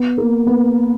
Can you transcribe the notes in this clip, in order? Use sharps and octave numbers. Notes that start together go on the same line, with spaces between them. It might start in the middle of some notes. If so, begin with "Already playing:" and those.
Already playing: B3
A#3
B3